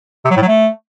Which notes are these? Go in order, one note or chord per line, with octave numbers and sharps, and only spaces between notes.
C3
F#3
A2
F#3
A3